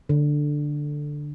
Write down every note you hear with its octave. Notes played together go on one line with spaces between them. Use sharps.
D3